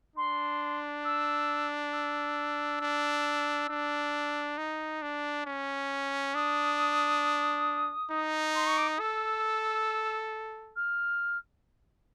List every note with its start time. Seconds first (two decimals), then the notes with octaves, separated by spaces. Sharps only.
0.16 D4 C6
1.05 E6
1.93 E6
2.81 D4
3.69 D4
4.58 D#4
5.02 D4
5.46 C#4
6.34 D4 D#6
8.11 D#4
8.55 C6
8.66 C#6
8.77 D6
8.87 D#6
8.99 A4 E6
10.76 F6